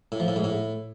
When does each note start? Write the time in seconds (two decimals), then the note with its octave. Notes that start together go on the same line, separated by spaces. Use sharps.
0.12 A2
0.20 F3
0.28 A2
0.36 G#2
0.44 A2